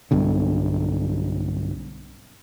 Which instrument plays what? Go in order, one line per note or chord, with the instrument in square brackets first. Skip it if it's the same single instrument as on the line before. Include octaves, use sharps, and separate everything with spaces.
[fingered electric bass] B1 G2 B2 D3